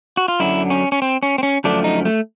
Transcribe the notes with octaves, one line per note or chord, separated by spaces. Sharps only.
F#4
F4
F#2 D3 F#3 E4
C#4
C#4
C4
C#4
C4
C#4
F#2 D3 F3 A3 D4
D#4
A3